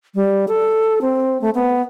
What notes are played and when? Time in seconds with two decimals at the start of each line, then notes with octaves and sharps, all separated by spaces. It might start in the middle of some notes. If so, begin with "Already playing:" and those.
0.15 G3
0.48 A4
1.01 C4
1.41 A3
1.55 B3